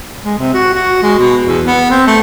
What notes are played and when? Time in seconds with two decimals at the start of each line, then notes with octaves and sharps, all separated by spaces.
0.25 G#3
0.38 C3
0.54 F#4
0.73 F#4
1.03 G#3
1.19 B2
1.47 E2
1.66 B3
1.91 C4
2.07 A3